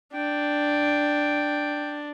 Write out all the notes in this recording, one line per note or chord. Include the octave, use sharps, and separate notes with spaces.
D4 G5